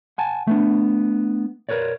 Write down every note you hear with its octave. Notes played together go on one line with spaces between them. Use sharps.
F#5 G#5 A5
A3 B3 D4
A#4 B4 C#5 D5